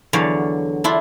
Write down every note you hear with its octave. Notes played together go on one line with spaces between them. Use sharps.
E2 D3 F#3 C#5 D5 F5
D4 E4 F4